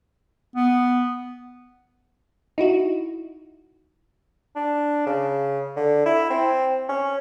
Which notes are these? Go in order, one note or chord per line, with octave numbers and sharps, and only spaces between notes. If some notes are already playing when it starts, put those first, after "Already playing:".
B3
D#4 E4 F#4
D4
C#3
D3
E4
C4
C#4